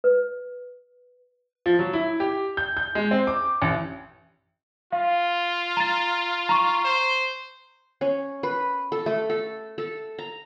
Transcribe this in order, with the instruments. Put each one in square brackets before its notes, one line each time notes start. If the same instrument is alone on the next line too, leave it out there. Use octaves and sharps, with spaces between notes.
[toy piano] B4
[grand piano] F3
F#3
E4
G4
G6
G6
G#3
C4
D6
A1
[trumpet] F4 [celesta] F5
[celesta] A#5 A6
A#5 C#6
[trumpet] C5
[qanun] C#4
B4
A4
A3
A4
A4
A#5